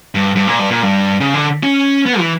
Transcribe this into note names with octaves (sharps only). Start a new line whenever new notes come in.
G2
G2
A#2
G2
A#2
G2
C#3
D3
C#4
B3
E3